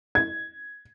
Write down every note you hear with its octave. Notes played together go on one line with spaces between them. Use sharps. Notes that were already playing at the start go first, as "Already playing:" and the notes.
G#6